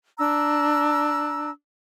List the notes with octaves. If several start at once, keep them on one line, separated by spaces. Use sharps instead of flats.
D4 A#5 E6